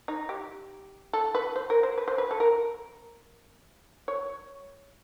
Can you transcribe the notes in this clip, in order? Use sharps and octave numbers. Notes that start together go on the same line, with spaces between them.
D#4
G4
A4
B4
C5
A#4
C5
B4
C5
B4
A4
A#4
C#5